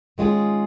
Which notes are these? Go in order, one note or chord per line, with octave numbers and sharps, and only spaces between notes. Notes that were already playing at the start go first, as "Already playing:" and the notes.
D#3 G#3 C#4 F4 G#4